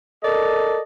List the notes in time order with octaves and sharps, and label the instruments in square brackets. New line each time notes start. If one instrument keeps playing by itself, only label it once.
[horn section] A4 A#4 D5 D#5